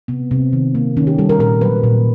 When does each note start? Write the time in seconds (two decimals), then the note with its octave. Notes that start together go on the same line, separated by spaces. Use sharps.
0.08 C3 B3
0.31 C3 C4
0.53 D#3
0.75 A#3
0.97 D#3 C#4
1.07 G4
1.18 G3 A4
1.29 A#4
1.39 A#2 A#4
1.61 F#3 B4
1.84 A#2